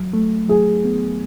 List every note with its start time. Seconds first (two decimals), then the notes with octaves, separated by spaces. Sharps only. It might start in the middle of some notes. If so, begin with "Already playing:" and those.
Already playing: F#3
0.13 A3
0.48 F#3 G#4
0.85 B3